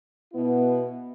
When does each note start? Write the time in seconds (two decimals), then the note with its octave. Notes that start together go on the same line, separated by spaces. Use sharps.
0.33 B2 B3 E4